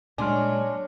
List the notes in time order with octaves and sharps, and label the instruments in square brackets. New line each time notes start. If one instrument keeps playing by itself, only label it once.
[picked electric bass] A#2 G#3 [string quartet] F#3 C#4 [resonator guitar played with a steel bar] D4 [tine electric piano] G#5 C6 F6